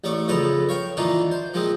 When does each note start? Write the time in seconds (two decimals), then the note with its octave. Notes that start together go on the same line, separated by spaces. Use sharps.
0.04 A1 A3 C#5 D5
0.28 F2 C#3 B3 A4 B4 A#5
0.69 C#5 F5 G5
0.97 D#3 E3 A#3 D4 D#4 F4
1.31 C5
1.54 A#2 F3 G#3 C4